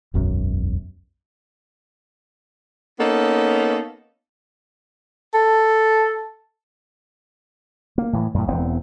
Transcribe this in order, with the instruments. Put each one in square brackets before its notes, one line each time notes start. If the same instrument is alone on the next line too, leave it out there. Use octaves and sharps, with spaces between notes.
[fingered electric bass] E1 B1 F#2
[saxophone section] A#3 B3 C#4 D#4 A4
[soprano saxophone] A4
[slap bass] A#3
A2 E3
F#2 A2
E1 E2 B3 C4